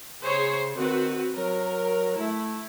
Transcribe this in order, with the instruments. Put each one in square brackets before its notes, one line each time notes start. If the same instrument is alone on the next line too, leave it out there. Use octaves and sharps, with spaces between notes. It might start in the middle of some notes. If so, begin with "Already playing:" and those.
[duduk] C#3 [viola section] G#4 C5 C#5
[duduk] D#3 [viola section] C4 F#4 B4
[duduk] F#3 [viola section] A#4
[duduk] A3 [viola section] E4